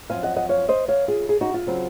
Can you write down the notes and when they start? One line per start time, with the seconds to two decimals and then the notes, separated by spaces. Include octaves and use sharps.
0.10 F#2 F3 C4 F5 G#5
0.23 D#5 F#5
0.36 D#5 F#5
0.49 C#5 F5
0.69 C5 D#5
0.88 C#5 F5
1.08 F4 G#4
1.29 G#4
1.41 D#4 F#4
1.54 F4
1.66 C#3 F#3 C4